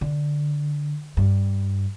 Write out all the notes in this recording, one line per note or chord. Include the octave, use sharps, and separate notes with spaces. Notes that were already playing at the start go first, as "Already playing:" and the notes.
D3
G2